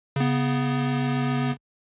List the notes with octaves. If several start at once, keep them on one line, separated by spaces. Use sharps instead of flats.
C#3 B3